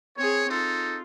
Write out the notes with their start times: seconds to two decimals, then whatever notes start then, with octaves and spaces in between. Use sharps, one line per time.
0.17 C4 G#4 C#5
0.50 D#4 F4 A4